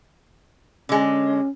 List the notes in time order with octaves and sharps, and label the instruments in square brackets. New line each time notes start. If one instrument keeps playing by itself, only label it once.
[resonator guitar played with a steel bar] D3 G#3 [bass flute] C#4